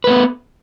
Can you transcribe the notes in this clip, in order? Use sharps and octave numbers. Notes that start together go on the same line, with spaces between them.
A3 B3 B4